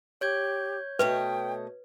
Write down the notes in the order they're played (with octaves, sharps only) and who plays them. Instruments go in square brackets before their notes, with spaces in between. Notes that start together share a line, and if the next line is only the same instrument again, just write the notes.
[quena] G4 [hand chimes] C#5 G6 G#6
[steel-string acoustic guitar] B2 A3 D#5 [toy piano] B4 [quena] G5